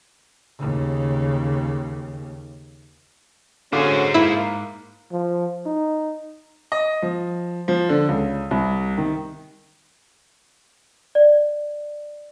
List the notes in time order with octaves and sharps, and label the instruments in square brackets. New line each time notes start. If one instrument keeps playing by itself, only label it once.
[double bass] D#2 C#3
[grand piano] D3 F5 D6 [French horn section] C#4 F#4 [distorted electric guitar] G#4 C5
[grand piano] G#2 [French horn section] A#3 [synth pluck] E4
[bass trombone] F3
D#4
[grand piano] D#5
F3
F3
D3
C#2
C2
D#3
[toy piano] D5